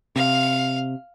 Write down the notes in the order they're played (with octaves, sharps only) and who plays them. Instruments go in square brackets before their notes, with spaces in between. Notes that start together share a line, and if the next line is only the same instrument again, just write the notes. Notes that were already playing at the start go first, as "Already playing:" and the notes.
[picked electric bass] C3 [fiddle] F5